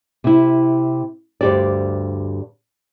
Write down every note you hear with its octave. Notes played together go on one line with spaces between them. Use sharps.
C3 E4
D2 G2 G4 C5 D5